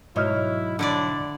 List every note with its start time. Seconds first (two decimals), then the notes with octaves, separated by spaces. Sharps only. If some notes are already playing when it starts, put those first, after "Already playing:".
0.16 G#2 B2 F#3 E4 C#5 D#5 F6
0.79 D3 D4 E4 D5